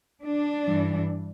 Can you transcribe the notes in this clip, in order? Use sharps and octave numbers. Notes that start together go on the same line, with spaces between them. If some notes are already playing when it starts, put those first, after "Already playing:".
D4
G2 E3